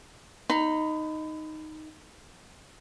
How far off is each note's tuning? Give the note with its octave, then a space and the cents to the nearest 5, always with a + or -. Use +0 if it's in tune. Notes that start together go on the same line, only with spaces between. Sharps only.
D#4 +0 B5 +30